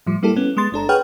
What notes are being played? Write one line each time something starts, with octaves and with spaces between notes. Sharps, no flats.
A2 F3 G3
G3 A#3 E4 G4 A4
B3 C#4
G#3 B3 C6 A6
G1 D4 A4 A#5
G#4 B4 C#5 F#5 G5 F6